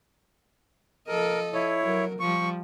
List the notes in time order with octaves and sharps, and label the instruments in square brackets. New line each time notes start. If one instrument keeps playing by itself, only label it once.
[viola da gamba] F3 A4 D#5 [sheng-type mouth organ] A#4
[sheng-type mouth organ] E4 C#5
[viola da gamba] F#3 A#4
[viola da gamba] F3 G3 [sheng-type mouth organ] C#6